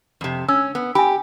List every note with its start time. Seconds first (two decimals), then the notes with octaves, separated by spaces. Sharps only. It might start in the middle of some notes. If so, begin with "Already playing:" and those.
0.21 F2 C3
0.48 C#4 E6
0.75 B3
0.95 G4 G#5 B5